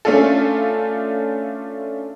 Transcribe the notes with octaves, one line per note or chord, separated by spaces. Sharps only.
A3 C#4 D4 F4 A4